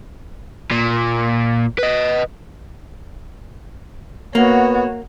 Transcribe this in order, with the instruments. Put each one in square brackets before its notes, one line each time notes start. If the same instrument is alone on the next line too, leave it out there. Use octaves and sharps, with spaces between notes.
[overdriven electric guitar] A#2
B4 D#5
[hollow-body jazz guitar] A#3 [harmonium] B3 [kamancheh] F#4 C#5